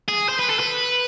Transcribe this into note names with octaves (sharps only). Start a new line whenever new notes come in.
G#4
C5
B4
A4
B4